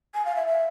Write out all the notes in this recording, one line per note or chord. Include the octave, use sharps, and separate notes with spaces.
G#5
F5
E5
E5